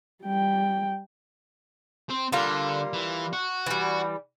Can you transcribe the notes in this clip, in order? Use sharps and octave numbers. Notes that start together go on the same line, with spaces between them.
G3 G5
C4
D3 G3 A#3 F4
E3
F#4
E3 G3